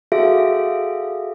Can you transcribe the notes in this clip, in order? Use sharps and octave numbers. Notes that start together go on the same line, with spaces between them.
F#4 G#4 A4 E5 F5